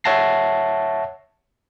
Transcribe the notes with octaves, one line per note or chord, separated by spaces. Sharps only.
C#5 E5 F#5 A5 A#6 C7